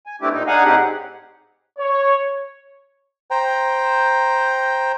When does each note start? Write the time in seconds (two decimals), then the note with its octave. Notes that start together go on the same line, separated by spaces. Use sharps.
0.06 G#5
0.21 A3 B3 C4 D4 E4 G4
0.33 A#2 D#4
0.47 D4 D#4 G#4 F5 F#5 G#5
0.65 A2 C4 D#4 G4 G#4 F#5
1.78 C#5
3.31 C5 G5 A#5